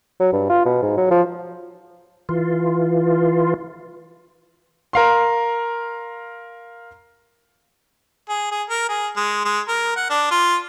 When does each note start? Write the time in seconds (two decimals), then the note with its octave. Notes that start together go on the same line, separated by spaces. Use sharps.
0.20 F#3
0.32 G2
0.49 F4
0.65 B2
0.82 G#2
0.97 F#3
1.11 F3
2.29 E3 F4
4.93 A#4 F5 C6
8.29 G#4
8.51 G#4
8.70 A#4
8.89 G#4
9.16 G#3
9.45 G#3
9.68 A#4
9.96 F#5
10.10 D4
10.31 F4